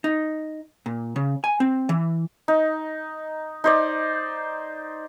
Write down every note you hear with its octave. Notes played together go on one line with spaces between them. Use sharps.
D#4
A#2
C#3
G#5
C4
E3
D#4
D#4 C5 D5